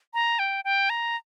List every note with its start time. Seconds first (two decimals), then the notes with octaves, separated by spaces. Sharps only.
0.14 A#5
0.39 G5
0.65 G5
0.90 A#5